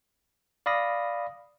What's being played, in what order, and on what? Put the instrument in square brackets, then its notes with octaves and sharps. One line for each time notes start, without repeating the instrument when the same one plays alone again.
[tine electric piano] D5 F5 B5 D#6 A#6